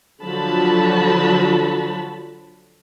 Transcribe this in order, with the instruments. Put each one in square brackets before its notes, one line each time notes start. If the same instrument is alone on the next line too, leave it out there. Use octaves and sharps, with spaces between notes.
[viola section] D3 F3 F#3 F#4 A5 B5